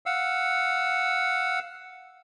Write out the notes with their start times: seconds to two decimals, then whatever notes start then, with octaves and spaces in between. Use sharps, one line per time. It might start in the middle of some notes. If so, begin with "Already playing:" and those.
0.06 F5 F#5 E6